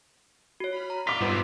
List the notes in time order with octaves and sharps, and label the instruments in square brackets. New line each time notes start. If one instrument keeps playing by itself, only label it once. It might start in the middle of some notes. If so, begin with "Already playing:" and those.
[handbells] F#4 C#5
[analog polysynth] B5 F6
[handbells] A#5
[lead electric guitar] F4 [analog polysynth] D5 E5 [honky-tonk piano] D6 B6
[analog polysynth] G2 D#4 C5 [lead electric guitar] A#2 B3 [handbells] F4 B4